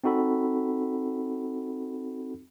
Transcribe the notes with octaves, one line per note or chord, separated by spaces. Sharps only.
C4 D#4 F#4 A4 B5